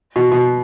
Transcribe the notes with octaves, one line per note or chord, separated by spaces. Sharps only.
B2
B2